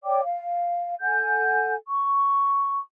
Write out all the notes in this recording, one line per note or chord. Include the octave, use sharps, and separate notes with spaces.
C#5 D5 G5 D6
F5
A4 F#5 G#5 G6
C#6